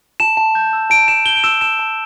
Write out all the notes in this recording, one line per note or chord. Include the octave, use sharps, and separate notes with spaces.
A5 E7
A5
G6
E6
A5 D7
A5 E7
G6 G7
D7
E6 E7
A5 E7
A5